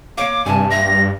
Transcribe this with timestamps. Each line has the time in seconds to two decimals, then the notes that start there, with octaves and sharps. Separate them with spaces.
0.18 A#3 C#5 F5 D6
0.46 G2 C3 D4 G#5 A5
0.71 A#2 E5 G5 A#6